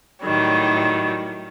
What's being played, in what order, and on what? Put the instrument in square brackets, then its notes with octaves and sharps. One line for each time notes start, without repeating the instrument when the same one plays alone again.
[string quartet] A2 D#3 F#3 G3